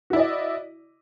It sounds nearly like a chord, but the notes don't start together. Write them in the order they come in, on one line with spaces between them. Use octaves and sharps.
F#4 E4 D5 D#5